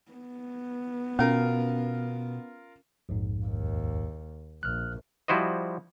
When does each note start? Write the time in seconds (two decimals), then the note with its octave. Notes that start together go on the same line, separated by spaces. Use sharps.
0.12 B3
1.19 B2 C#4 F4 A#4
3.09 A#1 F2 G#2
3.45 D#2
4.63 A#1 F6 F#6
5.28 F3 G3 E4 F#4 C5 D#5